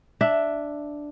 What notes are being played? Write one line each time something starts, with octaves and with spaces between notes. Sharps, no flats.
D4 E5